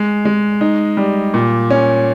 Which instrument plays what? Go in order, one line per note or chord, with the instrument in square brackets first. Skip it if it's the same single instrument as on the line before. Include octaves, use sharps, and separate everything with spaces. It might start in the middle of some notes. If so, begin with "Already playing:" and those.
Already playing: [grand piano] G#3
G#3
D#4
G3
A#2
C#4